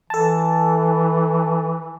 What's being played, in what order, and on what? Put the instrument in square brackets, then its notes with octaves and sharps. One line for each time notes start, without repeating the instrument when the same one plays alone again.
[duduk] E3 [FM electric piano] A4 A5